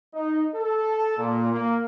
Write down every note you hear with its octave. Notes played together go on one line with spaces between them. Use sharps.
D#4
A4
A#2
A#3